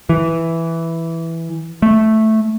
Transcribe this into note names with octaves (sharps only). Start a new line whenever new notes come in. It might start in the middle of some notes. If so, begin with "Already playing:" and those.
E3
A3